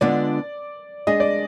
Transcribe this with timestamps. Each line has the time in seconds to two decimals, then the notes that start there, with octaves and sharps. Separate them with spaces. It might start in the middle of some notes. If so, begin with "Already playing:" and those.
0.01 D3 G#3 B3 D4 F4 D5
1.07 G#3 D4 G#4 D#5
1.20 D5